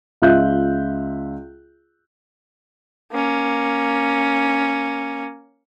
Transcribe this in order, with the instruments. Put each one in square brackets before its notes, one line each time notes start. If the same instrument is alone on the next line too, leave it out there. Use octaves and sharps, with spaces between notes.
[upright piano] C#2 F4 E5 F#6 G6
[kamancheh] A#3 C#4